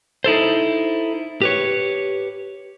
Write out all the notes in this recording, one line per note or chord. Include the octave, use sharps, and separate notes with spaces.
D#4 E4 A4 C5
G4 B4 C#5